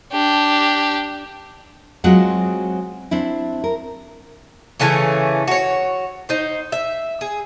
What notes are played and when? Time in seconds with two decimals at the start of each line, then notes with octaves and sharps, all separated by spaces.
0.13 D4 G4
2.04 F#3 G#3 C4 F4 F#4 F#5
3.11 C4 D4 E4
3.64 A#4
4.80 C#3 E3 A3 C#4
5.48 F#4 C#5
6.29 D#4 C5
6.72 E5
7.21 G#4